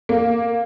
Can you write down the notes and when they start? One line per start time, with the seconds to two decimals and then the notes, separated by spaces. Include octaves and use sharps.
0.09 A#3